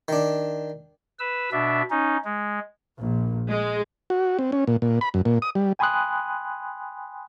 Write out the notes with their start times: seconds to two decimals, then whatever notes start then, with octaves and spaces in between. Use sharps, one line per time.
0.08 D#3 D4
1.19 B4 E6
1.52 B2 D4 E5
1.90 C#4 D#4
2.24 G#3
2.99 A#1
3.50 G#3
4.10 F#4
4.39 C4
4.52 C#4
4.67 A#2
4.82 A#2
5.01 B5
5.14 F#2
5.25 A#2
5.42 D#6
5.55 G3
5.79 G5 G#5 B5 C6 D#6 F#6